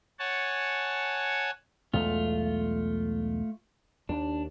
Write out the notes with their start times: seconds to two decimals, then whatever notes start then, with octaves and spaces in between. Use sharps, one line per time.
0.19 C#5 F#5 G#5 A5
1.93 B1 E2 G#3 A3 F4
4.09 D#2 D4